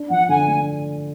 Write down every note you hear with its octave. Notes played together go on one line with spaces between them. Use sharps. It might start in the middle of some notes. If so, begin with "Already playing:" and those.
Already playing: D4
F3 F#5
D3 G#5
A3